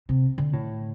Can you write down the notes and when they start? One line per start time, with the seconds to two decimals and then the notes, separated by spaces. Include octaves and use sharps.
0.09 C3
0.38 D3
0.53 A2